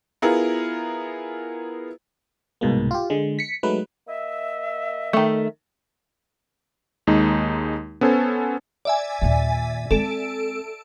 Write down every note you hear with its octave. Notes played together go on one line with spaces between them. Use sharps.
B3 E4 F4 G#4 A#4
C2 G#2 B2 G#3 A#3
F4 G4
D3 G#3
B6 C#7
F#3 G#3 A3 D#4 B4
A#3 D#5 E5
D#3 A3
D#2 G#3 D#4
B3 C#4 A4 C5 G#5
D5 E5 G#5
D#2 A#2
G#3 C4 A4 D7